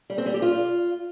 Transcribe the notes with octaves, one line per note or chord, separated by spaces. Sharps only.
G3
C4
G3
G4
F4